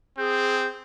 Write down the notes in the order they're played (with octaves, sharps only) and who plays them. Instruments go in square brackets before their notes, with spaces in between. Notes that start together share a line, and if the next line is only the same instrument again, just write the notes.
[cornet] C4 [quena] G#4 [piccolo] G6